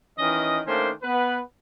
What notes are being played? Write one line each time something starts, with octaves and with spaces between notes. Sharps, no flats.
D#3 E3 C#4 D#5
D#3 A3 A#3 C#4 D4 C5
B3 B4